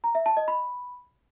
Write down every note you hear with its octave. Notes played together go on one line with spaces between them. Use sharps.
A#5
E5
A5
D#5
B5